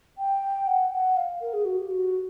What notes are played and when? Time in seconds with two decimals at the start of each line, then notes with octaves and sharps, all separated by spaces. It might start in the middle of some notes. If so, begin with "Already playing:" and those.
0.18 G5
0.67 F#5
0.92 F#5
1.17 F5
1.41 A#4
1.53 G#4
1.65 F#4
1.80 G4
1.91 F#4